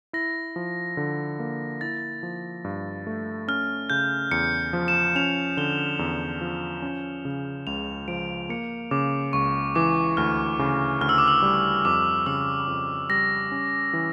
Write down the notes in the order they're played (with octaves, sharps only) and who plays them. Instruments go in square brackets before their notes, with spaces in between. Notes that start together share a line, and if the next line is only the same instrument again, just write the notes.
[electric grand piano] E4 [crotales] A#6
[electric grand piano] F3
D3
A#3
[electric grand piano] E4 [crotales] A6
[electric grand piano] F3
G2
A3
[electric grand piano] C#4 [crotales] F6
[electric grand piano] C#3 [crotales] G6
[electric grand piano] E2 [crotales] C#7
[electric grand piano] F3
[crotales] E7
[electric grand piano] C#4 [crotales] F7
[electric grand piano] D3 [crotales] G7
[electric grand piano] E2
F3
C#4
C#3
[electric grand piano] C#2 [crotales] F7
[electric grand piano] F3 [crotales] D7
[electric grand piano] A#3 [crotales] C#7
[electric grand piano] C#3 [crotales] D6
[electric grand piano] C#2 [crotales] C#6
[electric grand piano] E3 [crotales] D6
[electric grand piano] D2 [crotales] F6
[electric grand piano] C#3
[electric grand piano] D2 [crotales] F6
[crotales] E6
D6
E6
[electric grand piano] G3
[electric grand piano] F2 [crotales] D6
[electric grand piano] C#3 [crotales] E6
[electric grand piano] F2
[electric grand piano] G3 [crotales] A#6
[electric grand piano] C#4
E3